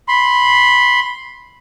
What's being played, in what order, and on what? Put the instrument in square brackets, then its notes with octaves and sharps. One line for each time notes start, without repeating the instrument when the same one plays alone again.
[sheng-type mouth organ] B5 C6